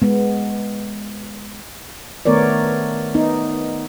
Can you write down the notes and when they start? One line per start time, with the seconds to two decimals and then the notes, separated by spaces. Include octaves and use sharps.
0.02 G#3 B3
2.25 D#3 A3 B3 A#4 C#5 D5
3.15 B3 D#4